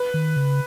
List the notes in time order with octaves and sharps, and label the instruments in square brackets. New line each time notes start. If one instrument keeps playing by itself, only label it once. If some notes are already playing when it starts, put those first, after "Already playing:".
Already playing: [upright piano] B4
[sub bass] D#3
C#3